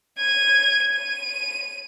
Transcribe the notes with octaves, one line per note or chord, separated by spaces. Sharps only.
G#6 D#7
D#7